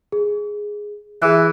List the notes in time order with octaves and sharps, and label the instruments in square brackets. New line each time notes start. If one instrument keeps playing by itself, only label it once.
[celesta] G#4
[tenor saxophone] E3 [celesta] G#4 F#6